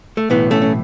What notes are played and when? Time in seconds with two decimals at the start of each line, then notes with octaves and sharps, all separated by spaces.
0.17 A3
0.30 B1 A2 E3 B3
0.51 A3 C#4
0.62 C#4